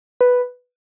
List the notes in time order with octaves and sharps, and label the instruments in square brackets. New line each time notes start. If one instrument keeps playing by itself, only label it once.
[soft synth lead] B4